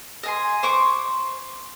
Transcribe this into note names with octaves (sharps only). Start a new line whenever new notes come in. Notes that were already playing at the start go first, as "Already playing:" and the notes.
D#5 G#5 C6
C5 C#6 D6